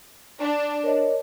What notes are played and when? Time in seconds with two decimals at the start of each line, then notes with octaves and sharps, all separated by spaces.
0.42 D4
0.83 A#4 C#5 D#5